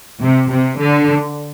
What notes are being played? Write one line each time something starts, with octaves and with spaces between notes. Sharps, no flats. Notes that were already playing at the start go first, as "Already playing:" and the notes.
C3
C3
D3